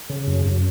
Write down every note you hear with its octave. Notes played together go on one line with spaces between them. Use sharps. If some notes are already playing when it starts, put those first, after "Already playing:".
C#3
F#2
F#2